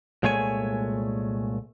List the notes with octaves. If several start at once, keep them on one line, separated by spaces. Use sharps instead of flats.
C2 A#2 G#3 A3 C#5 G#5